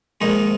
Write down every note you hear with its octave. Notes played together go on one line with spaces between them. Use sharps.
A#1 G#2 D#3 G#3 D#4